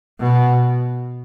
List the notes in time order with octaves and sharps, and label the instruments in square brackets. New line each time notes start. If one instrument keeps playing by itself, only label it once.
[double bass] B2